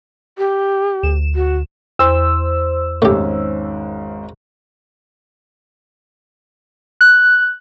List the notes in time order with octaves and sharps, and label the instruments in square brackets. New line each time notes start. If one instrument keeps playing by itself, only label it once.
[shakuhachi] G4
[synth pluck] D2 E7
[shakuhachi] F#4
[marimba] E2 [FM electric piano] C5 E6
[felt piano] G#1 G#2 C#4 [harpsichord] A3 G4
[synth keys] F#6